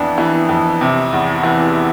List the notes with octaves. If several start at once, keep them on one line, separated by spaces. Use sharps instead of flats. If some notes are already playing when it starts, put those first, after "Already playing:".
Already playing: F2 E3 B3 D4
E3
F2
C3
E2
E3